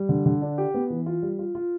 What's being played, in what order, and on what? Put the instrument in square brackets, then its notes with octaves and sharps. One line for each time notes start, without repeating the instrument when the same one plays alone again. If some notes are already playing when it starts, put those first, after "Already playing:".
Already playing: [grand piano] G3
D3
D3
D4
G4
B3
E3
F4
G3
F4
F4